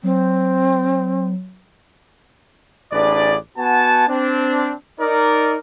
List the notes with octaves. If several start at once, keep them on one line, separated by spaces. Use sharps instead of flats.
F#3 C4
A1 D4 G#4 B4 D5
B3 F#4 F#5 G#5 A5
C4 D4
D#4 A#4 D5